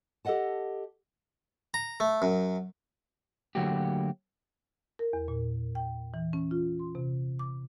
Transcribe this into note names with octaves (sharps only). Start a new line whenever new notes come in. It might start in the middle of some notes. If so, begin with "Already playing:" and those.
G4 A4 C#5 D#5 F#5 A5
A#5
A3
F#2
D3 F#3 A3 A#3 F#4 G4
A#4
E2
A#2
G5
E3
C#4
F4
C6
C3
D6